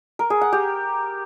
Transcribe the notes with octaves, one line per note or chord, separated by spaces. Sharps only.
A#4
G#4
F#5
G4